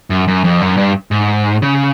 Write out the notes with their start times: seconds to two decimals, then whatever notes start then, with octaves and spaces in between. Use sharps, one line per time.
0.10 F#2
0.28 F#2
0.44 F2
0.61 F#2
0.77 G2
1.11 G#2
1.62 C#3